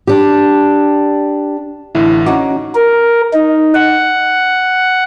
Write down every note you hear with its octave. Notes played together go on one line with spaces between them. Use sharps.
D4 G4
A1 D3 E4
C#4 D#4 F#4 D6
A#4
D#4
F#5